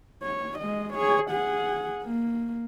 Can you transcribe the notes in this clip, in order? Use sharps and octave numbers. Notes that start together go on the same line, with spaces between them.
C#5
G#3 D#5
G#4 C#5
G#4 F#5
A#3